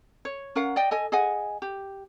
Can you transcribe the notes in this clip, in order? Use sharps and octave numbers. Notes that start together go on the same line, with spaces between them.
C#5
C#4 A#4 F5 F#5
D5 D#5 G5
A4 D#5 G#5
G#4 D#5 F#5 G#5
G4